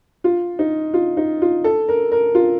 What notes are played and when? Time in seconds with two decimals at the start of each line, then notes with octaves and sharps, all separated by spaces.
0.24 F4
0.59 D#4
0.94 F4
1.17 D#4
1.42 F4
1.64 A4
1.89 A#4
2.12 A#4
2.35 F4